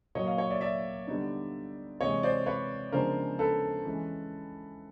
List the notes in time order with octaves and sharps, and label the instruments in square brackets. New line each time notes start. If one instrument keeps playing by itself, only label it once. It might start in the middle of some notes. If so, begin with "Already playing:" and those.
[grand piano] A#2 F#3 A#3 C#5 D#5
D#5 F5
C#5 D#5
D5 E5
D5 E5
D3 G3 B3 D#4
C3 E3 G#3 C#5 D#5
C5 D5
B4 C#5
C#3 F3 G#3 B3 D4 A#4 C5
A4 B4
E3 G#3 C#4